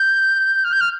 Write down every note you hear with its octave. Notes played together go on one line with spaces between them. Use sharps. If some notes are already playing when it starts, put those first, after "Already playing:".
Already playing: G6
F6
G6
F6